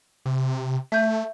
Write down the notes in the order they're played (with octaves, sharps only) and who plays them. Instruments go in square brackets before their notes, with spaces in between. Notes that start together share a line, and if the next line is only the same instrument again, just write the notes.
[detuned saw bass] C3
[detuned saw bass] A3 [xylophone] E5 G6